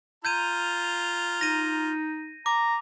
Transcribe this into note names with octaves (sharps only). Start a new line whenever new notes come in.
F4 A#5 G6 G#6 D#7
D#4 A#6 D#7
A#5 D6